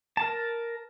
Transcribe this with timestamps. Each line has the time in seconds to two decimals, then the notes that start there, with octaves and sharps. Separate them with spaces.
0.17 A#4 A5